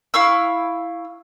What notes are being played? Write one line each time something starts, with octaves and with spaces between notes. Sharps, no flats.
E4 F5 C#6 E6